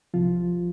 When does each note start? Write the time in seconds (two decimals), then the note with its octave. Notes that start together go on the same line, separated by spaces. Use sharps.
0.14 C2 C3 F3 F4